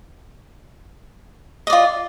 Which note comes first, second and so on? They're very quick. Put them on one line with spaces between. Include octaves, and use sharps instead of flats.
D#5 D5 F4